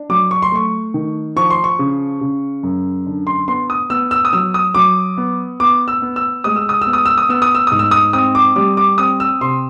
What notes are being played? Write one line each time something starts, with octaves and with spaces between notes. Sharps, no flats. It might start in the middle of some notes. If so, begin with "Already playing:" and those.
Already playing: D4
F#3 D6
C#6
C6
A3 C#6
D#3
F3 C#6
C6
C#6
C#3
C#3
F#2
D3
C6
B3 C6
D#6
B3 E6
E6
D#6
F#3 E6
D#6
F#3 D6
B3
B3 D6
E6
B3
E6
G#3 D#6
E6
D#6
E6
B3
D#6
E6
D#6
B3 E6
D#6
E6
G#2 D#6
E6
D#6
C4 D#6
D6
G3 D6
D6
C4 D#6
E6
C3 C6